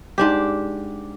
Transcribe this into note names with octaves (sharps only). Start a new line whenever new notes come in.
G#2 D4 G4